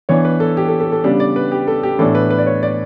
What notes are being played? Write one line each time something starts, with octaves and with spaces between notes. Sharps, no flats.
E3 B3 D4 C#5
B4
A4
G4
A4
A4
A4
C#3 G3 B3 D4 G4
D5
B4
G4
A4
G4
A2 E3 B3 D4 A4
B4
B4
D5
C#5
D5